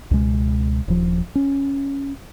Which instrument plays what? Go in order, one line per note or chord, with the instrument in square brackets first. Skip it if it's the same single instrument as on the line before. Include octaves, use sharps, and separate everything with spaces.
[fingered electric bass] C#2 B2 G#3
D#1 F3
C#4